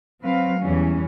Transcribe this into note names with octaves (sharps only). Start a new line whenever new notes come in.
F#3 C4 B4 F5
E2 E3 G3 C#4